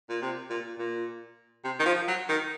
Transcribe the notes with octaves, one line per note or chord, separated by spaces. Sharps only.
A#2
C3
A#2
A#2
C3
D#3
F3
F#3
D#3